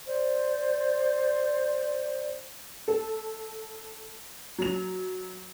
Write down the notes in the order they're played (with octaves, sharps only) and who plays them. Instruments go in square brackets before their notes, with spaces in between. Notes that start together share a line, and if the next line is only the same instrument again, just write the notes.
[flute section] C5 D5
[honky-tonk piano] A4
F#3 F7